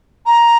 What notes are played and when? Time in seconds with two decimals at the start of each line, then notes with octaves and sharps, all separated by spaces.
0.26 A#5